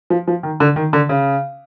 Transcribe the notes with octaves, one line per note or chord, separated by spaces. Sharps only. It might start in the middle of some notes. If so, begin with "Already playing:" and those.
F3
F3
D#3
D3
D#3
D3
C#3